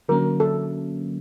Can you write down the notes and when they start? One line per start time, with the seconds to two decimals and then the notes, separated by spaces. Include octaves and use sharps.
0.09 D3 F#3 A#3 C#4 A#4
0.40 A4